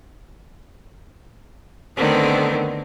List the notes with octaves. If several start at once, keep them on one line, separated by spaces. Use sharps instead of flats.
D3 D#3 A3 B3 C4